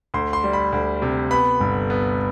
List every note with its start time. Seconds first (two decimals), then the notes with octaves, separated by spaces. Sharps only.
0.14 D2 C6
0.33 C6
0.44 G3
0.53 B5
0.72 D2
1.02 C3
1.31 B3 B5
1.61 G1
1.90 B3